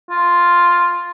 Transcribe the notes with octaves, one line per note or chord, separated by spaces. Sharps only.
F4